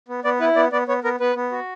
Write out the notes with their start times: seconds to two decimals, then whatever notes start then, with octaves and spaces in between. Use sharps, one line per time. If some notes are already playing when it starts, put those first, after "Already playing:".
0.08 B3
0.24 B3 D5
0.40 E4 B4
0.56 B3 D5
0.72 B3 D5
0.88 B3 C#5
1.04 B3 A#4
1.20 B3 B4
1.36 B3
1.52 F#4